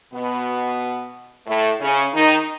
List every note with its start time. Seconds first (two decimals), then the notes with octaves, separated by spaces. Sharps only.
0.13 B2 B3
1.46 A2 A3
1.80 C#3 C#4
2.13 D#3 D#4